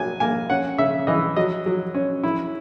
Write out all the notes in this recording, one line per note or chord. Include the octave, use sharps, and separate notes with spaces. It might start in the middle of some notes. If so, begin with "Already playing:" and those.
Already playing: F#3 A#3 G#5
A#3 G#5
C#4 F#5
C#3 E5
E3 D#5
F#3 D#5
F#3
C#4
E4